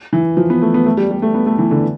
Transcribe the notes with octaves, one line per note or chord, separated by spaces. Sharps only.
E3
F3
B3
A3
B3
A3
G3
G3
A3
B3
A3
E3
D3